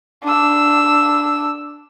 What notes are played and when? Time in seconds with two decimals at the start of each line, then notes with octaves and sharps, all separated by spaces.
0.23 D4 E6